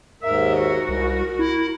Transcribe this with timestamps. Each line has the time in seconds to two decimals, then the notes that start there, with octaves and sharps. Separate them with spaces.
0.23 D#2 G#2 A#4 E5
0.58 F#4
0.89 C2 A#4
1.39 E4